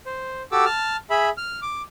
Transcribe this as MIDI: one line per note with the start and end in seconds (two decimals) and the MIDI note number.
0.06 0.42 72
0.52 0.65 66
0.52 0.65 67
0.52 0.65 69
0.52 0.65 86
0.52 0.65 88
0.65 0.97 81
0.65 0.97 89
1.10 1.29 68
1.10 1.29 76
1.10 1.29 83
1.38 1.60 89
1.62 1.82 86